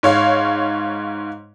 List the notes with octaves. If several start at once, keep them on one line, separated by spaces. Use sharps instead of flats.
G#2 C#5 F5